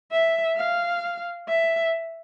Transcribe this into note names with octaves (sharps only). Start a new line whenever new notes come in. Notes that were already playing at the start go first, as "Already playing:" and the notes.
E5
F5
E5